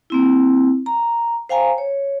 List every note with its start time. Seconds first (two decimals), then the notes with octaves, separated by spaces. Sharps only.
0.10 A#3 C4 E4
0.86 A#5
1.49 C5 F5 G5 G#5 A#5
1.78 C#5